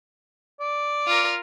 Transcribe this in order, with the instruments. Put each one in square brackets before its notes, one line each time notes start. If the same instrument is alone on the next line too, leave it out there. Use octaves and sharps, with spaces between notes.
[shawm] D5
[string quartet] F4 A#4